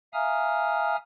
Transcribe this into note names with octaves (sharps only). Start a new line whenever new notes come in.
E5 F5 G#5 A#5 D#6 F6